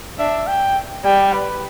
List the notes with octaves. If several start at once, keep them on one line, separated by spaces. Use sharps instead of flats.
D4 E5
G5
G3 G5
B4